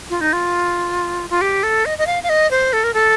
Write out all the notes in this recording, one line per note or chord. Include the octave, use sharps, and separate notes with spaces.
F4
D#4
F4
F4
G4
A4
D#5
D#5
F5
F5
D#5
C5
A4
A#4
A4